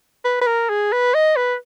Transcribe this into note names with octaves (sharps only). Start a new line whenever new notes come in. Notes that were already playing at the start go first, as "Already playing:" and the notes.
B4
B4
A#4
G#4
B4
D#5
B4